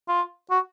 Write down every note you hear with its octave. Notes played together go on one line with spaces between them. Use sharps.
F4
F#4